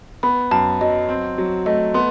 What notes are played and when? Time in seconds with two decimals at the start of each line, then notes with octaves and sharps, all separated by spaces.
0.23 B3 B5
0.51 F#2 A5
0.81 F#3 D#5
1.09 C4
1.38 F#3
1.66 A3 D#5
1.94 B3 C6